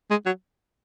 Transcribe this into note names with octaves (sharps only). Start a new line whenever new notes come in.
G#3
F#3